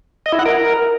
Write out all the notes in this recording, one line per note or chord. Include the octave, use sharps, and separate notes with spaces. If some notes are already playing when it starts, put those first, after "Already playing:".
D#5
E4
F#5
A#4